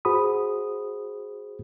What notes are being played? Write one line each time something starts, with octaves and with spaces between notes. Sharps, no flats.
F#4 G#4 C5 B5 D#6